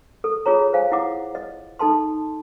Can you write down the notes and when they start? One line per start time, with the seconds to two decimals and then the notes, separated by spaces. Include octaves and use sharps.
0.24 A4
0.46 F4 G#4 C#5 A#5
0.73 C5 F5 G#5
0.92 E4 F#5 D6
1.35 D#5
1.79 D#4 A4 A5 C6